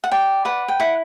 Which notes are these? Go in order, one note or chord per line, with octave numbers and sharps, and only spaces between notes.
F#5
D5 G5
B4 F#5
G5
E4 F#5